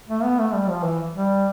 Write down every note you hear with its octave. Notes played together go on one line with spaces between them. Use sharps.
A3
B3
A3
G3
F3
E3
G3